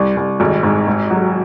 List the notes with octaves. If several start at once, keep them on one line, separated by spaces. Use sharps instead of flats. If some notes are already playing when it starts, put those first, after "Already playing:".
Already playing: C2
C2
G#1
G#2
G#2
F#3